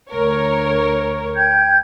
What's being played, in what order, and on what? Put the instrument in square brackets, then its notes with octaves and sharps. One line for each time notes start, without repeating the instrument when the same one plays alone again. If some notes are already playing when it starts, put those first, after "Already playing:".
[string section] D2 A#4 C#5
[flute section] G5 G6 G#6